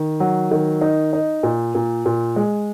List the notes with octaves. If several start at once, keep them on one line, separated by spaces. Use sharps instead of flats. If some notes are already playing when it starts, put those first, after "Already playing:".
Already playing: D#3
F#3
D#3
D#4
D#4
A#2
A#2
A#2
G#3